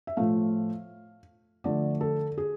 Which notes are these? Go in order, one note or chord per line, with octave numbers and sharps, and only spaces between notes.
E5
A2 F3 A3 F5
D3 F3 A3 D5
A4
G#4